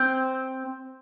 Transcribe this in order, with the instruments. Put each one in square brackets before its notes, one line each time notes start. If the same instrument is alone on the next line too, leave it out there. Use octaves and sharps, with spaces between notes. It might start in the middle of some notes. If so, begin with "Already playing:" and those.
Already playing: [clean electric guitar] C4